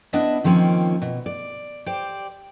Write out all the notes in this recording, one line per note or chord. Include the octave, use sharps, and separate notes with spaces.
B3 D4 E4 D#5 E5
D#3 F3 A#3 C4 C#4
B2
D5
G4 C5 D5